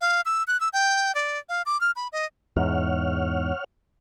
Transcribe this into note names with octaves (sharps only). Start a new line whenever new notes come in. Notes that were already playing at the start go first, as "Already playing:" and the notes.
F5
E6
F#6
E6
G5
D5
F5
D6
F6
B5
D#5
E2 G#2 C#5 F#5 F6